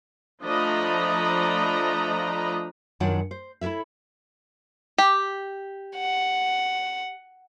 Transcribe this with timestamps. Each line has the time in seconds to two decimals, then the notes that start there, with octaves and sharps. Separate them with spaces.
0.42 F3 A3 D4 D#5 A#5 B5
3.00 F#2 D#3 F#3 D4 F4 F#5
3.31 C5
3.61 E4 A4 A#4 C#5 E5
4.98 G4
5.98 F#5